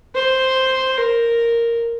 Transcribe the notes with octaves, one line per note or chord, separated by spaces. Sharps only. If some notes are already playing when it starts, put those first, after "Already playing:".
C5
A#4